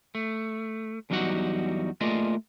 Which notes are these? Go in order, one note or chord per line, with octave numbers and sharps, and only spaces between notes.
A3
E2 F#3 G3 D#4 F#4 F#5
A3 A#3 F4 G#4 D5 D#5